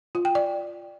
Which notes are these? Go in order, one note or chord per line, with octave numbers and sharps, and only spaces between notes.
F4
G5
D5